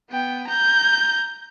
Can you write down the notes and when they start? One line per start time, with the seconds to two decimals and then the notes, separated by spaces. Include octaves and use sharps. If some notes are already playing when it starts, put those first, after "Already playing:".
0.10 B3 G5
0.48 A#5 G6